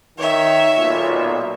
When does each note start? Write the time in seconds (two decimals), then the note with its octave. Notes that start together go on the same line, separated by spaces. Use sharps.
0.18 D#3 C#5 E5
0.79 B1 A#2